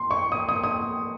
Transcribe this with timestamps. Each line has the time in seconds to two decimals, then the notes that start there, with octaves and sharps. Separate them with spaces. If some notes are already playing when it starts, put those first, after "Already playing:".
Already playing: C6
0.11 C#6
0.32 D#6
0.49 D#6
0.64 D#6